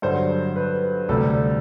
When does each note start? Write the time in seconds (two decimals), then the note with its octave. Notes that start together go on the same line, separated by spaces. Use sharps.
0.02 G2 D3 F#3 C5
0.56 B4
1.09 D2 C3 G3 A4